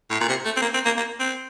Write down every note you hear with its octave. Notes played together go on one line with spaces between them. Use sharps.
A2
A#2
C3
A3
C4
A#3
C4
A#3
A#3
C4